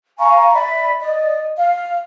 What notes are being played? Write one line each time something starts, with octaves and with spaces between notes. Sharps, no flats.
F5 G#5 A#5 C#6
D5 E5 B5
D5 D#5
F5